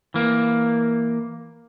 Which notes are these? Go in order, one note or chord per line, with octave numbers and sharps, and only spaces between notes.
E3 A#3